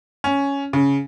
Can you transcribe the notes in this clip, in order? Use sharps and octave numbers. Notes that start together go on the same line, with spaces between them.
C#4
C#3